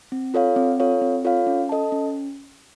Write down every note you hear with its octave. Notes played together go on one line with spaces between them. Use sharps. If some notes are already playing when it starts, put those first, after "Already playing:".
C4
F4 A4 C#5 F5
C4
F4 A4 C#5 F5
C4
F4 A4 C#5 F5
C#4
A4 D#5 A5
C#4